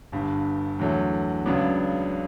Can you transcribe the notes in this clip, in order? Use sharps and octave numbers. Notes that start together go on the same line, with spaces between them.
G1 G2 D3
E2 D3 F#3 A3
C#2 C#3 F#3 B3 D4